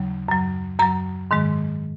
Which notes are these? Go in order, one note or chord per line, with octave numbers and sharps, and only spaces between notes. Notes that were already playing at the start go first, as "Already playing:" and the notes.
Already playing: D#2 C#3 F#3
F#2 F#3
F#2 F#3 A#5
G#2 D#3 G#3